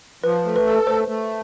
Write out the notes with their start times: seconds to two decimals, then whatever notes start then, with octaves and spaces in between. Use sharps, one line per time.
0.24 F3 B4
0.45 A3
0.56 B4
0.67 A4
0.87 A3 C5
1.08 A3